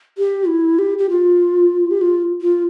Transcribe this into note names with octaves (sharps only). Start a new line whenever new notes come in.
G4
E4
G4
G4
F4
G4
F4
F4